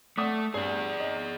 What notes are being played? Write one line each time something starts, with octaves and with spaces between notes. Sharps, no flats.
A3 D5 F#5 D#6
G2 G#4 D5
D#4 D#5